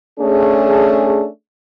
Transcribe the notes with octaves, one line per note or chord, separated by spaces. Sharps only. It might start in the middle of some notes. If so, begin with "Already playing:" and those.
A3 C#4 D4 G#4